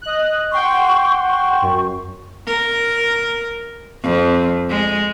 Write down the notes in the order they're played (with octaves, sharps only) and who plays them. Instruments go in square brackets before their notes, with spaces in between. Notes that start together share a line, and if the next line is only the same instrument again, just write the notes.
[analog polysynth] D#5 F#6
[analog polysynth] F#5 G5 C6 [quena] C#6
[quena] C#6
[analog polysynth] F#2
[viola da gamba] A#4
F2
G#3